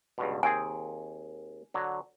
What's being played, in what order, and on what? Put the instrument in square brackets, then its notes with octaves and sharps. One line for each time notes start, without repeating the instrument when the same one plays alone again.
[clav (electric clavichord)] C#2 G2 B2
[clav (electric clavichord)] D#2 C4 G#4 [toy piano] G#5
[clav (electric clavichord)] D3 F#3